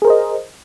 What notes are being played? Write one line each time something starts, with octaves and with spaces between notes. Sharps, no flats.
G#4 A#4 C5 D#5